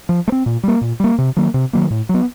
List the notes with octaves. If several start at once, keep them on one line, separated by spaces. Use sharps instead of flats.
F3
A3
C4
A#2
G3 A#3
A#2
G3 A#3
C3
D#3 F#3 A#3
C3
D#3 F#3 A#3
A2
F#3
B3